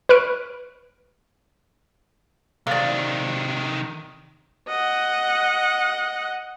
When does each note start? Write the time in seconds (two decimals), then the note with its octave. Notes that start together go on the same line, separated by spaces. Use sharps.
0.09 B4 C#6 F6 D7
2.67 C3 D#3 D5 F5
4.69 D#5 F#5